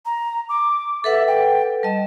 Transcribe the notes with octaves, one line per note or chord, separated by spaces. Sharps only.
A#5
D6
A4 B4 E5 F#5
G5
G3 D#5 A5